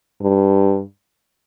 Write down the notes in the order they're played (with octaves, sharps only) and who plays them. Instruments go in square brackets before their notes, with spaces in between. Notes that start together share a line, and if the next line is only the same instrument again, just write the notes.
[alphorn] G2